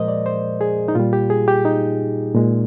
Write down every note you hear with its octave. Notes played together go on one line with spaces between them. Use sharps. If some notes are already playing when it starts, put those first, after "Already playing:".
Already playing: A#2 F3 G#3 A#4 C5 D#5
D5
C5
G#4
D#4
A#2 G3 F4
G4
G#4
G4
D#4
A#2 G#3